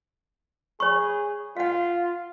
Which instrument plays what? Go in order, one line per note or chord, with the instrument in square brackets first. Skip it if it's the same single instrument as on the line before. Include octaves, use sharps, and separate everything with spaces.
[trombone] G#4 [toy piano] C#5 B5 C#6
[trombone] F4 [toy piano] F5 F#5